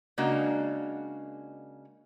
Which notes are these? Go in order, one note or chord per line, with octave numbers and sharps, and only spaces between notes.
C#3 G#3 A#3 D4 F#4 D#5